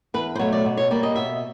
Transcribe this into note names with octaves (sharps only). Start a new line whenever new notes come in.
E2 B4
C5
B2 F#3 A3 C#5
D5
B2
C#5
G3 A#3 D5
D#5
B2 E5